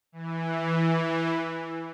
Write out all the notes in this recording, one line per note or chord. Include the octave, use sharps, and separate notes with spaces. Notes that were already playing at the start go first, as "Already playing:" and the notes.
E3